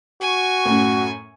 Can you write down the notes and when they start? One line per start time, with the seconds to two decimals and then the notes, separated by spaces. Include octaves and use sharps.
0.21 F#4 G#5 C#6
0.65 F#2 A2